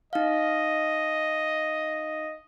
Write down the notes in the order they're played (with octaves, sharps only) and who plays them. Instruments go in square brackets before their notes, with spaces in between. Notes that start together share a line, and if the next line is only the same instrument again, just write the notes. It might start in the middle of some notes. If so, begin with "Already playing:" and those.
[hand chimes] D#4 F5 [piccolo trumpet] D#5